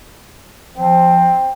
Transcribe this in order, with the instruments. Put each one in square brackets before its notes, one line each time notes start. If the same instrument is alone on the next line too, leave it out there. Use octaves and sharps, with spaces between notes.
[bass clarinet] F3 [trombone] C4